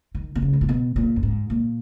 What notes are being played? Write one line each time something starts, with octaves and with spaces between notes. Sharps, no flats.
D#3
B2
C#3
G#2
A#2
B2
A#2
F#2
G#2
A#2